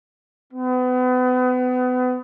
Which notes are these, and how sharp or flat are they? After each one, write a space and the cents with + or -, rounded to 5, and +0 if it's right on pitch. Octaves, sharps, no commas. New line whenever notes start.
B3 +35